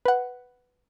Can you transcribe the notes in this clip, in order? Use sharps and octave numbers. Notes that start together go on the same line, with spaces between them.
B4 F#5